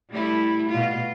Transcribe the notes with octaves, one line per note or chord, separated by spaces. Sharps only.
G3 A3 E4
B2 F4